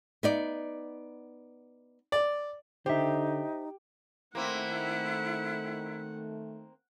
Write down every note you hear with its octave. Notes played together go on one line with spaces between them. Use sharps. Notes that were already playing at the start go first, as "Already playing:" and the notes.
B3 D#4 D5
D5
D3 D#4 G4 C5 E5
D#3 A3 A#3 C4 E4 F#5